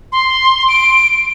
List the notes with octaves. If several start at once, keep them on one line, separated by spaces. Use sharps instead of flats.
C6
D7